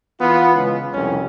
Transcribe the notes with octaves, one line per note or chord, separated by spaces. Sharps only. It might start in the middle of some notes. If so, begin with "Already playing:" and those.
E3 B3 F4
C#2
C2 F2 C#4